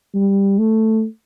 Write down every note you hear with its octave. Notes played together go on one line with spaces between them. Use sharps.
G3
A3